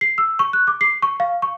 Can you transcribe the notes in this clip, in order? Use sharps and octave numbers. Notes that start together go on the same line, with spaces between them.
C7
E6
C#6
F#6
D6
C7
C#6
F5
C#6